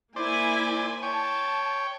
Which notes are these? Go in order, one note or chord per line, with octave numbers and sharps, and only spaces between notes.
A#3 E4 C5 D5 G#5
C#5 G5 A5